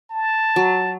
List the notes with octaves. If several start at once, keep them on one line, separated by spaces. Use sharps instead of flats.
A5
F#3